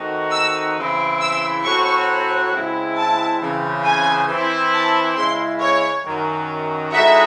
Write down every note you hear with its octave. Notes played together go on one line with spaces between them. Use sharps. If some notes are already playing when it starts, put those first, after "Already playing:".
Already playing: D#3 A3 C4 D#4 F#4
E6
C#3 E3 C4 E4
E6
A2 F#3 C4 F#4 C#6
C#3 G#3 C4 E4
A5
C#3 E3 C4
G#5
E3 C4 E4
A5
C#3 G#3 C#4 E4 C6
C#5
F#2 D#3 F#3
A2 G#3 D#4 F#4 E5